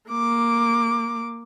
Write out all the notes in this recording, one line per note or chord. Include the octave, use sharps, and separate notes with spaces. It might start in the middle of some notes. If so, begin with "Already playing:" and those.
A#3 D6